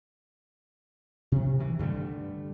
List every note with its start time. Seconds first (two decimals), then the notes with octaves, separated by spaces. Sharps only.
1.32 C3
1.59 C3 D#3 E3
1.79 G2 D3 G3 A3